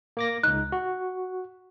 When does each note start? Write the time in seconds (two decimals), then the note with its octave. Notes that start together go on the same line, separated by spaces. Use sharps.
0.17 A#3 D6 A#6
0.43 C#2 D#4 F#6
0.72 F#4